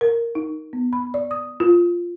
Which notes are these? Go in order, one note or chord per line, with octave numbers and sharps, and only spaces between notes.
A#4
D#4
B3
B5
D5
D#6
F4